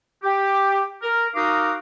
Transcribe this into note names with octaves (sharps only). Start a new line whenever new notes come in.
G4
A#4
D#4 F#4 A#4 F5 D6 D#6